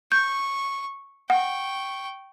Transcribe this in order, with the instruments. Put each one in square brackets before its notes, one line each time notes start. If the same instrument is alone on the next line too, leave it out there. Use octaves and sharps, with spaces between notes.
[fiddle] C#6 [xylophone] G6
[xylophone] F#5 [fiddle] G5 C#6